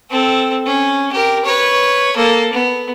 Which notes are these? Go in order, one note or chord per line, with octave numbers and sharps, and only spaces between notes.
C4 A4
C#4
G4 A#4
B4 C#5
A#3 A4
B3